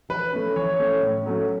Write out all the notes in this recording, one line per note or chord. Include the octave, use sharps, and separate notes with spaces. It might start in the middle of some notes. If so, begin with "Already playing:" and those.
E3 B4
A3 C#4
E3 C#5
A3 C#4
A2
F#3 A3 C#4